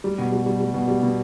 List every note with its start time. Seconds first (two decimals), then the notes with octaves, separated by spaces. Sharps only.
0.04 G3
0.18 B2
0.32 G3
0.46 G3
0.60 G3
0.74 B2
0.88 G3
1.03 B2